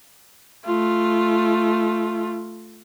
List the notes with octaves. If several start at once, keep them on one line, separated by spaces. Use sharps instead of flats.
A3 F4